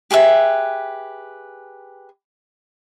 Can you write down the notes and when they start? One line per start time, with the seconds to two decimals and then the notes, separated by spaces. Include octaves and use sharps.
0.11 G4 G#4 B4 E5